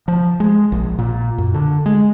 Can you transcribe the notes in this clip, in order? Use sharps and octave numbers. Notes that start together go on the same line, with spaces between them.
F3
G#3
A#1
A#2
F#2
D3
G#3